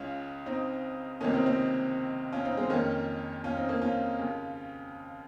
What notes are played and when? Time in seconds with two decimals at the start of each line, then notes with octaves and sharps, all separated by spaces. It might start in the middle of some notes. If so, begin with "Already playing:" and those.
Already playing: C#2 C#3 C#4 F4
0.46 C4 D#4
1.21 C#2 C3 D#3 A#3 C#4
1.34 C4 D#4
1.46 C4 D#4
2.33 C#4 F4
2.45 C4 D#4
2.57 G#3 C4
2.70 F2 D#3 A#3 C#4
3.44 C#4 F4
3.57 C4 D#4
3.69 A#3 C#4
3.81 C#4 F4
4.19 D#2 C#3